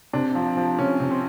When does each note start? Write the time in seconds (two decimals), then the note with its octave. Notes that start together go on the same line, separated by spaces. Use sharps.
0.13 C3 D4
0.35 F3
0.57 F3
0.78 C3 C#4
1.00 C3
1.10 C4